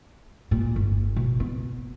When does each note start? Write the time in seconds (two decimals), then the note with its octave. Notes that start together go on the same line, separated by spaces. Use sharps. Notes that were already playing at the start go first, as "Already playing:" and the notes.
0.51 A#2
0.76 G1
1.16 B2
1.40 B3